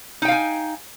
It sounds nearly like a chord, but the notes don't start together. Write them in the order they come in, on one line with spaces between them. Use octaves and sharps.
D#4 G5 F5 G#5